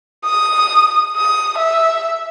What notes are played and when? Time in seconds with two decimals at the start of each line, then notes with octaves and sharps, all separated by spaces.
0.25 D#6
1.17 D#6
1.58 E5